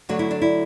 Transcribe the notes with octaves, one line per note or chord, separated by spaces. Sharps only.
D3 F#3 A3 F#4
E4
D4
E4